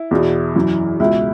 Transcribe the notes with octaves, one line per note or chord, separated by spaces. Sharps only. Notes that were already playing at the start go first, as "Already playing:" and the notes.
Already playing: E4
E2 B2
F#2 E3
C#2 B2 E4